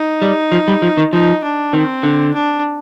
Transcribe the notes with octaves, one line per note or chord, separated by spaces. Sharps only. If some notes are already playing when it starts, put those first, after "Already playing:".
Already playing: D#4
G3
F3
G3
F3
D#3
F3 D#4
D4
D#3 C4
D3
D4